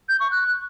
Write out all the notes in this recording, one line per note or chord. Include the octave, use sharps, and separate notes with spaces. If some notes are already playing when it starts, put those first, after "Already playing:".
G6
C#6
F#6